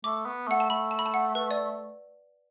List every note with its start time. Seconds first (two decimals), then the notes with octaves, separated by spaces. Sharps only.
0.04 A3 D6
0.26 B3
0.47 A3 F#5
0.60 A5
0.70 A3 B5
0.91 A5
0.99 B5
1.06 A5
1.14 F#5
1.35 B4
1.51 D5